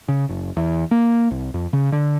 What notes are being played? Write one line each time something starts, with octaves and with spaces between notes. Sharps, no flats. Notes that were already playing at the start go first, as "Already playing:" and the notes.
C#3
F#1
E2
A#3
C2
F2
C#3
D3